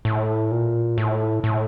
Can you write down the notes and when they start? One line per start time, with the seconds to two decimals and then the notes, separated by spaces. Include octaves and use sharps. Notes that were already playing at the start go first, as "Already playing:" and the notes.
0.05 A2
0.51 A#2
0.98 A2
1.44 A2